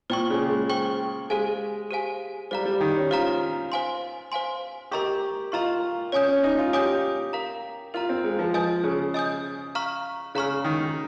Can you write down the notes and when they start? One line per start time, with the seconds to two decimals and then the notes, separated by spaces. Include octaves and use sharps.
0.10 A#2 C5 G5 C#6
0.30 C#3
0.49 G#3
0.70 C5 G5 C#6
1.30 G#3 G4 C5 F5 G#5
1.91 G4 C5 F5 G#5
2.51 G3 C5 F5 A#5
2.65 G3
2.81 D#3
2.96 C#4
3.11 F4 C5 F5 A#5
3.72 C5 F5 G#5 C6
4.32 C5 F5 G#5 C6
4.92 G4 A#4 D#5 A#5 C#6
5.52 F4 A#4 D#5 A#5 C#6
6.12 C#4 C#5 G#5 D#6 G6
6.28 C#4
6.43 D#4
6.59 F4
6.73 G4 C#5 G#5 D#6 G6
7.33 A#4 F5 A#5
7.94 F4 A#4 F5 A#5
8.09 C4
8.24 G#3
8.39 F3
8.54 F3 D#5 G#5 D#6 G6
8.84 C#3
9.14 D#5 G#5 D#6 G6
9.75 F5 A#5 C#6 F6
10.35 C#3 F5 A#5 C#6 F6
10.64 D#3